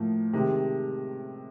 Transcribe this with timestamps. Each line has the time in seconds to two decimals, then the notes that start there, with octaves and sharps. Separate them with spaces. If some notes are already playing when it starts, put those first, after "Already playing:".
Already playing: A2 F3 A#3
0.33 C3 D#3 G#3